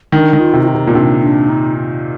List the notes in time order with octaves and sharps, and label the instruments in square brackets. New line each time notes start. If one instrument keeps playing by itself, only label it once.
[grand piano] D#3 [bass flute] D4
[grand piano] D#3
[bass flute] F4
[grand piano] C3
[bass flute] F4
D#4
[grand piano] C3
A#2
[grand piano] C3 [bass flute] D4
[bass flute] D4
D#4